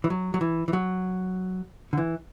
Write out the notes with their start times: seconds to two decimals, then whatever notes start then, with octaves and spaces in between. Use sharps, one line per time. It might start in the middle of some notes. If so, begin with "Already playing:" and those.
0.04 E3
0.10 F#3
0.34 F#3
0.41 E3
0.68 E3
0.73 F#3
1.93 D3
1.98 E3